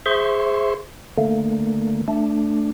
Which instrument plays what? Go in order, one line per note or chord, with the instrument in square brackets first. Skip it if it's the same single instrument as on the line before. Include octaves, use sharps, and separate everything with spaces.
[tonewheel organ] G#4 C5 E5 C6 C#6
D3 A3 A#3
A3 D4